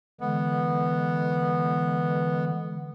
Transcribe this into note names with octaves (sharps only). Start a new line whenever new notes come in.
D3 E3 G#3 B3